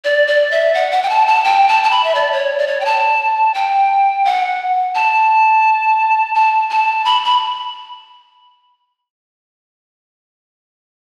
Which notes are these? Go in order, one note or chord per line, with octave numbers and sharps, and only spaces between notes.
D5
D5
E5
F#5
F#5
G5
A5
A5
G5
A5
A5
B5
E5
D5
C#5
D5
C#5
G5
A5
G5
F#5
A5
A5
A5
B5
B5